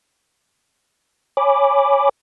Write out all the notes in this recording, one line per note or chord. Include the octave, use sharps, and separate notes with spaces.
C#5 G#5 B5 D6